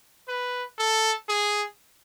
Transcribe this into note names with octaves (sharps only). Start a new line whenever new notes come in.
B4
A4
G#4